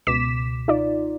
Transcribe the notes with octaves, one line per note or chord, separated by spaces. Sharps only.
C#2 B2 D6 B6 E7
D#4 F4 D5